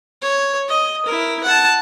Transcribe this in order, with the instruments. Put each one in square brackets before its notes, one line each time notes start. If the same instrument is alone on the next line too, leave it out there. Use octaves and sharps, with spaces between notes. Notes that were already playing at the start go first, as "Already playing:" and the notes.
[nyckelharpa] C#5
D#5
E4 A#4
F#5 A5